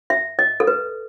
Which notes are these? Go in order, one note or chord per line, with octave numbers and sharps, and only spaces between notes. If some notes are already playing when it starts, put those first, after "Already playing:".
E5
D#5
A4
B4